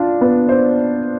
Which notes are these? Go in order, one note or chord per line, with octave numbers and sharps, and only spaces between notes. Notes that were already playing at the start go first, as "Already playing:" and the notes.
Already playing: D4 F4
B3
C5